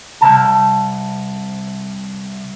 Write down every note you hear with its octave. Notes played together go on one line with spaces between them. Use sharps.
C2 G#2 C3 A5